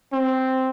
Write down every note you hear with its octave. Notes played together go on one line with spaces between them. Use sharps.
C4